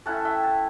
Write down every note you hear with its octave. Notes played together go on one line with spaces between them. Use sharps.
A3 C#4 E4 F#5 A5
E5 G5
F#5 A5